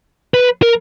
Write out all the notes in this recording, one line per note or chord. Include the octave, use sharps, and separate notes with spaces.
B4
A#4